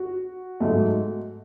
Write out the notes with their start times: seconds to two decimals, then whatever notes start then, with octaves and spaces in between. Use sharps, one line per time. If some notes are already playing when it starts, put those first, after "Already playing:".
Already playing: F#4
0.60 G#2 F#3 A3